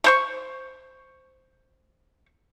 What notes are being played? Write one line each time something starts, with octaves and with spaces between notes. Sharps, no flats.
A3 C5 C#6